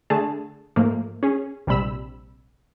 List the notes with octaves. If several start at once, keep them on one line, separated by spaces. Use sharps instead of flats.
D3 A3 G#4 A5
G#2 F3 A3 A#3
C#4 G#4
A#1 C3 G3 B5 E6